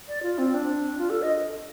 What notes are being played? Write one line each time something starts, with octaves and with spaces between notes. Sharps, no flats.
D5
F4
C4
D4
F4
A4
D#5